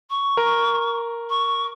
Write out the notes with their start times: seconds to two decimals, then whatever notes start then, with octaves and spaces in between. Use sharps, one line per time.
0.10 C#6
0.37 A#4
1.29 C#6